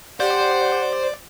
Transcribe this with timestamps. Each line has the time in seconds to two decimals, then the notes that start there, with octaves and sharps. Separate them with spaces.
0.20 G4 C5 D5 F#5